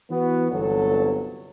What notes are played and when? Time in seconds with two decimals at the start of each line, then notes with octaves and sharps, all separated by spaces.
0.11 E3 B3 F#4 B4
0.51 G1 C2 F#3 A4